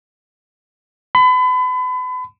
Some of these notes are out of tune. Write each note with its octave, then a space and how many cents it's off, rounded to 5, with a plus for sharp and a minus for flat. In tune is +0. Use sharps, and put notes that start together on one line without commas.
B5 +35